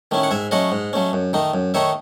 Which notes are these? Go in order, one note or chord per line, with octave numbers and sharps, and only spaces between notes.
D#3 A3 C#4 E4
F#5
G#2 E5 G#5
F#3 A3 C#4 D#5 F#5
G#2
F#3 A3 C#4
F#2
D#3 A3 D#4
F#2
D#3 A3 D#4 C#5 E5